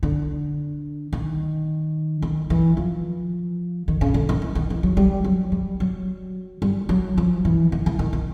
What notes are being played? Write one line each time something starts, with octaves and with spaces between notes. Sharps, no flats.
D3
D#3
D#3
E3
F3
D#3
C#3
D3
D#3
E3
D#3
E3
F#3
G3
F#3
G3
F#3
G3
F#3
F3
E3
D#3
E3
D#3
D#3